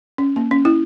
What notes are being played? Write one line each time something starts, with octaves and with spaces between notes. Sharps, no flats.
C#4
A#3
C#4
E4